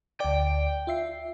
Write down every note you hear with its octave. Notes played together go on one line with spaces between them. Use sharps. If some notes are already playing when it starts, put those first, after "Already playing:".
D2 D5 G5
F4 E5 C7